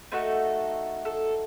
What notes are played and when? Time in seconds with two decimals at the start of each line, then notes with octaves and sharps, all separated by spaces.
0.12 A3 D#4 F#4 A4 C5
1.05 A4